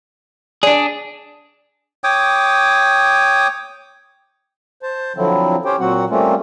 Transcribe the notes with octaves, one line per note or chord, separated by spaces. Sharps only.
D4 G#4 D5
C#5 G5 D6 D#6
C5 A5
D3 F3 F#3 C4 E4
C#4 G4 C5 C#5 G5
A#2 F#3 C4 F#4 F#5
G3 A3 A#3 C4 C#4 F4